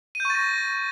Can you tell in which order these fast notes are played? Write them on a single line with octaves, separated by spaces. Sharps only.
D#7 G6 C#6 A6 A#6